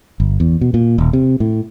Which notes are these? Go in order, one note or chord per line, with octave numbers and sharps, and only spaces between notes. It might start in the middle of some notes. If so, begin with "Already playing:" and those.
G1
E2
B2
A#2
D#1
C3
A2